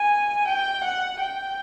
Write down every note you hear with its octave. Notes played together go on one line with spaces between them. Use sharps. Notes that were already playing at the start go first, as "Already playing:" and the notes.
Already playing: G#5
G5
F#5
G5